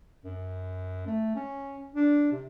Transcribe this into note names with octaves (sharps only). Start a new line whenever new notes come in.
F#2
A3
C#4
D4
C3